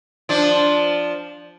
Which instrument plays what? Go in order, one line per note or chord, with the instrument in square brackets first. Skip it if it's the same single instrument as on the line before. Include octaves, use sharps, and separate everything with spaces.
[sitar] F3 D4